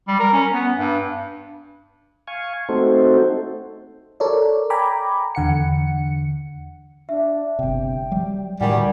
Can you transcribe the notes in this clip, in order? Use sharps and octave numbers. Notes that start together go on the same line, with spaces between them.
G3
A#4
C#4
B3
G2
F5 G#5 C#6
A3 C4 D#4 F#4 A4 C5
A4 A#4 C#5 D5
G5 G#5 A#5 B5 D6
E2 D3 F#5 C#7
D4 E5
G1 C3 G5
F#3 G3
D2 A2 D#3 G3 F#5 G#5